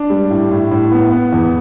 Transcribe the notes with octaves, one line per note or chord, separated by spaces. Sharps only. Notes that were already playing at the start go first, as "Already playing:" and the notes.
Already playing: D4
G3
A2
A2
A2
B3
B3
E2